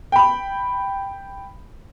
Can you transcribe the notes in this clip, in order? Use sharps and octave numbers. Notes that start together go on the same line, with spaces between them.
G5 B5